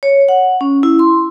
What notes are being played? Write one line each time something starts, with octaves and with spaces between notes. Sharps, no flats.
C#5
F#5
C#4
E4
C6